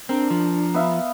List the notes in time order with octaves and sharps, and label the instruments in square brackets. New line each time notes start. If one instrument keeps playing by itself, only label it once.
[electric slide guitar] C4 [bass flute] D4 [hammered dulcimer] A#4
[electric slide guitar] F3
[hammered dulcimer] B3 E5 F5